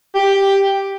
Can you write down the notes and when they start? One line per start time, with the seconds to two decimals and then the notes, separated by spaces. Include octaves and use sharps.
0.15 G4